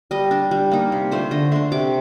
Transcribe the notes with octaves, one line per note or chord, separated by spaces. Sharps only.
G3 D#5
D4
G3
A#3 D#4
C3
F3 A3 D4 C5
D3 D#5
A3 D4 C6
C3 D6